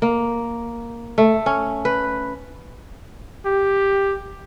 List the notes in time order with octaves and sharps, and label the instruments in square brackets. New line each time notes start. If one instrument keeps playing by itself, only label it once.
[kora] A#3
A3
C#4
B4
[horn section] G4